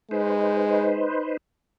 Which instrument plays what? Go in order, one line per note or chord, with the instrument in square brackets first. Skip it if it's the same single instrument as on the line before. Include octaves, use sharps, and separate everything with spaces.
[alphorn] G#3 [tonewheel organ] D#4 B4 C5